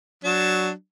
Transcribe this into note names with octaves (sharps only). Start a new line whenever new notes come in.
F#3 D4